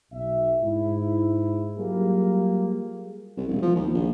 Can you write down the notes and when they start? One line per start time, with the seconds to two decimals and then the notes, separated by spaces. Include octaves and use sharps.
0.12 B1 E5
0.62 G#2 E4
1.77 F#3 G3 A#3 F4 G4 G#4
3.37 C2
3.49 E1
3.62 F3
3.76 D#2
3.95 A#1